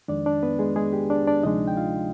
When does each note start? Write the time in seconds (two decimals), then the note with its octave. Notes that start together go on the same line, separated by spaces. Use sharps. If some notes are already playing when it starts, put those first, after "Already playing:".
0.08 F2 D#3 G#3 D4 D5
0.26 D4 D5
0.43 B3 B4
0.59 G#3 G#4
0.76 G#3 G#4
0.93 G4
1.10 D4 D5
1.27 D4 D5
1.43 D2 C3 F3 G#3 D4 D#4 D#5
1.68 G5
1.77 F4 F5